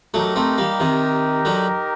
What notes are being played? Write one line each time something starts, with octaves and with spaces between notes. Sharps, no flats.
F#3 A3 D#4 G4 A#4
A3 C4
G3 A#3
C3 D#3
D3 F#3